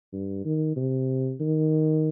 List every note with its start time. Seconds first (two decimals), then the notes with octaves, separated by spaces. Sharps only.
0.13 G2
0.45 D#3
0.76 C3
1.41 D#3